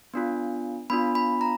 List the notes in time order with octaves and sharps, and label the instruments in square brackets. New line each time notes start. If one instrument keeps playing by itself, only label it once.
[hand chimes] B3 D4 F4
B3 D4 F4 B5
B5
A#5